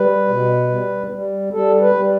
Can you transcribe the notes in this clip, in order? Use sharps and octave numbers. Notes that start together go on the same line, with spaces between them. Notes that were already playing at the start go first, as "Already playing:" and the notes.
Already playing: G3 B4
B2
G3
G3
G3 A4
B4
G3